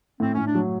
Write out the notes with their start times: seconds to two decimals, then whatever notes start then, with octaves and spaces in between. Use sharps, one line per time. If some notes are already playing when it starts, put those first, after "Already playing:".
0.20 A2 C4
0.33 A2 C#4
0.46 D4
0.55 F#3